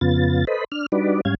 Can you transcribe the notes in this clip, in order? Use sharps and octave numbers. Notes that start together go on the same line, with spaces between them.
F2 C#3 B3 F4 A6
A4 B4 C5 D#5 B5
D4 F6
G3 D4 D#4 F#4 B4 D5
G#2 G3 C#4 F5 G#6